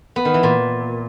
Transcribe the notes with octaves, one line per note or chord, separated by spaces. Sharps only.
B3
D#3
E3
A#2